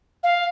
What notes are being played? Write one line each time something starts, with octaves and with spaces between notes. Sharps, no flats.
F5